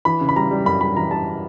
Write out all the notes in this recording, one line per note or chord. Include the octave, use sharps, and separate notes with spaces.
E3 B5
C#3
B5
G3 A#5
G3
F#2 B5
G3 B5
E3 A#5
G3 A5